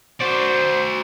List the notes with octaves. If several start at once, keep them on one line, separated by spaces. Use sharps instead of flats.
F#4 C5 D5